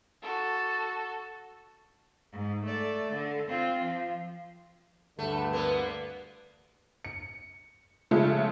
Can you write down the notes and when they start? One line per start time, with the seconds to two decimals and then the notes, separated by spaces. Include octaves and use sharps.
0.22 F#4 A4
2.33 G#2
2.64 A3 D5
3.13 D3
3.49 C4 F4
3.80 F3
5.19 D2 G2 D3 A3
5.53 A#3 B3
7.05 C#7
8.11 C#3 F3 G#3 A3 F4 A4